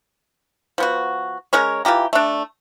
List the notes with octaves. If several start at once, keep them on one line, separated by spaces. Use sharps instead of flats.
F3 B3 F#4
G#3 C#4 A#4 C#5
E3 F4 G4 A#5
A3 D4